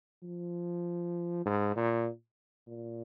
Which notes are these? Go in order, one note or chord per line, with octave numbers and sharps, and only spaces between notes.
F3
G#2
A#2
A#2